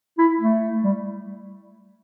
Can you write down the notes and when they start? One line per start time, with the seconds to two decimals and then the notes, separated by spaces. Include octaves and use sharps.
0.18 E4
0.40 A3
0.84 G3